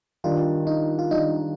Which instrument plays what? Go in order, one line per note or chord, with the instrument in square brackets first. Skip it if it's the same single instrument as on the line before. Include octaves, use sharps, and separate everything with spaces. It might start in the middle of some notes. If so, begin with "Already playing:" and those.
[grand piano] D#3 G3 D4 [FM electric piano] F4
[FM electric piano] D#4
F4
[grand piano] D#3 G3 D4 [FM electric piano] D#4